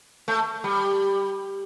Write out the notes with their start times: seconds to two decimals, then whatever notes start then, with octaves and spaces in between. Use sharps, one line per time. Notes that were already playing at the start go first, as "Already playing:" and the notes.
0.28 A3
0.64 G3